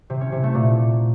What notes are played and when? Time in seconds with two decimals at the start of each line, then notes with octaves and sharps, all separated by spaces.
0.10 C3
0.21 C#4
0.32 C3
0.43 A3
0.55 A#2